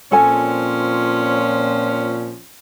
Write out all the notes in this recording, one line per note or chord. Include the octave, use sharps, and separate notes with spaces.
A#2 F3 C4 C#4 A4 G#5